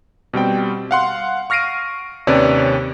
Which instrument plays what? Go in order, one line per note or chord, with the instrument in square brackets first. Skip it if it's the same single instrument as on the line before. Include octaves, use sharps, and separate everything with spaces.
[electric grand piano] B2 G3 C4 G5
F5 F#5 C6
C#6 F6 A#6 C7 D7 D#7
D#2 C3 C#4 B4 C#5 D5